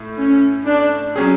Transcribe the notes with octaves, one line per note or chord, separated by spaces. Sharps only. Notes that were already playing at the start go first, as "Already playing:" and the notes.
Already playing: A2
C#4
D4
F#3 C#4 G#4